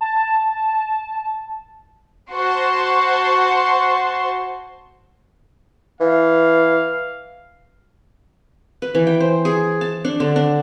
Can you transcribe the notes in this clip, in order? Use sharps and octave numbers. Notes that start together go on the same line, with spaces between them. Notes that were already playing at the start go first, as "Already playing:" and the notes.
A5
F#4 C5 A5 C6
E3 F5
B4
E3
G5
C5
G#4
A5
D4
D3
D4